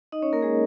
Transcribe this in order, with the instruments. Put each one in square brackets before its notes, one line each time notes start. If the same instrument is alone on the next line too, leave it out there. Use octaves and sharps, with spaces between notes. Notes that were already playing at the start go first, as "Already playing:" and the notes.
[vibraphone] D#4 D#5
C#4 C#5
A#3 A#4
G#3 G#4